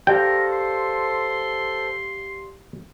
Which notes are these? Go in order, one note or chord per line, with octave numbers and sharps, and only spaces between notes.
G4 A4 A#4 C5 D5 F5 G5
C6